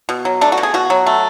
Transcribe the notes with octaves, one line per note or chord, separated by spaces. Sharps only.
B2
F#3
A3 D4
F#4
B2
G#4
B2 F#4
F#3
A3